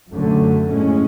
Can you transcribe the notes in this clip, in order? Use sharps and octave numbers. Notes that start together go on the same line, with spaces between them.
F#2 D3 F#3 A3
A2 G#3 C#4